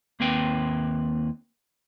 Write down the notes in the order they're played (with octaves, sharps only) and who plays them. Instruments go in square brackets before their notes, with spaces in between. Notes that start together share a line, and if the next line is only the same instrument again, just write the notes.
[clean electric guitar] D#2 A#3 C4 B4 G5